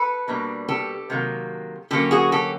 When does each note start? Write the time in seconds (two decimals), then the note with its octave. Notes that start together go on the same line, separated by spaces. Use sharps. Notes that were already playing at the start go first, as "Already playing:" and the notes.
Already playing: A4 B4
0.28 B2 G3 A#3 D4
0.68 G4 A4
1.10 C3 D#3 F#3 A#3
1.91 D3 F#3 A#3 C#4 G4 A4
2.11 F#4 G#4
2.32 G4 A4